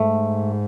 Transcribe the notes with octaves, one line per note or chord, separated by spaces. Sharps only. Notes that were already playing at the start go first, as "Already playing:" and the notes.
Already playing: G#2 A3